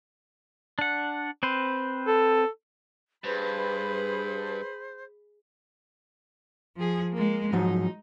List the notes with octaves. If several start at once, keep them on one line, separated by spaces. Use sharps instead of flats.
D4 F#5
C4 B4 C5
A4
G2 G#4 B4 C5 B5
F3 G#4
G#3 A#3
G#2 F3 F#3 D#4